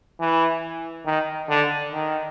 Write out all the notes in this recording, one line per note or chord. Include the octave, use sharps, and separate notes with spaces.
E3
D#3
D3
D#3